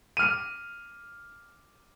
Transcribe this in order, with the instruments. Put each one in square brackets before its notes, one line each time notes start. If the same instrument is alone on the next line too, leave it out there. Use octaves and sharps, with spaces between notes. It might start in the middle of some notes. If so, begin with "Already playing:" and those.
[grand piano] F6 D#7